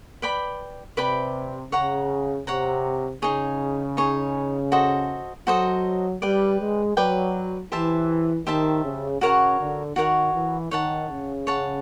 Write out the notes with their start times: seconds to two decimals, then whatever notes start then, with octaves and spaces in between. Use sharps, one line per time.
0.22 B4 D5 G5 B5
0.97 C3 B4 D5 G5 B5
1.72 C#3 C#5 F#5 A#5
2.47 C3 C#5 F#5 A#5
3.22 C#3 D#4 G#4 C#5
3.97 D#4 G#4 C#5
4.72 F#4 A4 C5 D#5
5.47 F#3 F#4 A4 C5 D#5
6.22 G3 B4 D5 G5
6.60 G#3
6.96 F#3 B4 D5 G5
7.72 E3 G4 C5 E5 A5
8.47 D#3 G4 C5 E5 A5
8.84 C#3
9.21 C#3 F#4 A#4 C#5 F#5
9.59 D3
9.96 D#3 F#4 A#4 C#5 F#5
10.34 E3
10.71 D#3 C#5 F#5 A5
11.10 C#3
11.47 C#5 F#5 A5